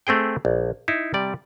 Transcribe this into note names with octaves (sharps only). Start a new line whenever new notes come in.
A3 C4 G#4 G5
A#1
D#4 E4
C3 G3 D5